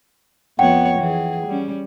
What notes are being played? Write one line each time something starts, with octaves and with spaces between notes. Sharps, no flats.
F2 B3 C#5 F#5 G5
E3 G#4
G3 C#4